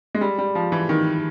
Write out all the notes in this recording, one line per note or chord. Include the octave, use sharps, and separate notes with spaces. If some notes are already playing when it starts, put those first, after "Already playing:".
G#3
G3
G3
F3
E3
D#3